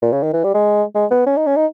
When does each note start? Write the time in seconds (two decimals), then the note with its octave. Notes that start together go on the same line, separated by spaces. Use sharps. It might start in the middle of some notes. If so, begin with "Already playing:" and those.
0.02 A#2
0.13 C#3
0.23 D#3
0.33 E3
0.44 G3
0.54 G#3
0.95 G#3
1.11 B3
1.26 C#4
1.37 D#4
1.46 C#4
1.57 D#4